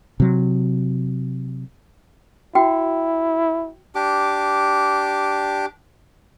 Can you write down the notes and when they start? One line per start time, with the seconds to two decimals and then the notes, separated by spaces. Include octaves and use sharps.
0.20 C3 F#3
2.55 E4 F#4 G5
3.95 D4 G4 D6